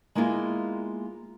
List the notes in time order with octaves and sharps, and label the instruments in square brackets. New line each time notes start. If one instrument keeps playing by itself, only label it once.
[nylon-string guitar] G#3 A#3 B3 E4 F4 G#4